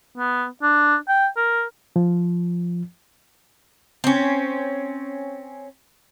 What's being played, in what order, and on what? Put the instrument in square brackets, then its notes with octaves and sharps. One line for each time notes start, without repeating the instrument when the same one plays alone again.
[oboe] B3
D4
G5
A#4
[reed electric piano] F3
[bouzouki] C4 C#4